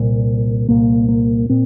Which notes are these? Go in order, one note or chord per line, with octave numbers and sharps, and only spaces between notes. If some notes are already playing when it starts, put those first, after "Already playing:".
Already playing: C2 A#2
C2 A#2 A#3
A#3
A#2 C4